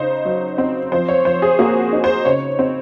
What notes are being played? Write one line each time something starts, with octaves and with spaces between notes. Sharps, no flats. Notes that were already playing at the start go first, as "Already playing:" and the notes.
Already playing: C#3 D#4 C5
F#3
C4
F3 C5
C#5
F3 C5
G#4
A#3 F#4
D#4
C5
C#3 C#5
C4